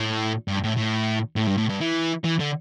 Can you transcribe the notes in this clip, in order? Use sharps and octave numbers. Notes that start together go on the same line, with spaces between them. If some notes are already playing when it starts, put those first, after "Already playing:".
Already playing: A2
G2
A2
A2
A2
G2
A2
G2
E3
E3
D3